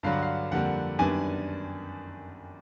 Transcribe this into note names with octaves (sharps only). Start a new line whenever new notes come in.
G2 D3 F#3 F5
F#5
F5
F2 D3 G3 A#3 F#5
F#2 D#3 G3 B3 D4 G#5